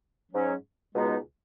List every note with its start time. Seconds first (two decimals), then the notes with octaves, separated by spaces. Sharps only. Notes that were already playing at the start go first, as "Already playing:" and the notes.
0.31 G#2 F#3 C#4
0.94 C#2 B2 G#3 B3 D#4